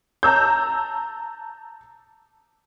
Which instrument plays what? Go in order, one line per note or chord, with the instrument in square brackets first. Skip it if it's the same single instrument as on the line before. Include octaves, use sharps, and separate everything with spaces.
[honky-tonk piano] A5 A#5 E6 G6